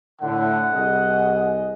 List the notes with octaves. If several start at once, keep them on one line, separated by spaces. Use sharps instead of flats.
A2 D3 F#5
C2 G#4 D#5